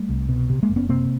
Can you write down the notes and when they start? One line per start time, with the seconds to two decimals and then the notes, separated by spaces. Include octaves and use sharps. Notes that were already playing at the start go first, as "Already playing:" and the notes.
Already playing: G3 A3
0.09 C2
0.29 B2
0.50 C3
0.63 G#3 A#3
0.69 F#1
0.76 B3 C#4
0.89 C3 A#3 C4